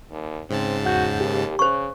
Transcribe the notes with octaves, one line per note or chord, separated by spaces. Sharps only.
D#2
G#2 C#3 C4 A5
E2 F#4 F#5 G6
D#2 G4
C#3 C5 C#6